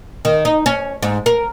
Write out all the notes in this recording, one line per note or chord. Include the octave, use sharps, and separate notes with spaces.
D#3
D#4
C#4
G#2
A#4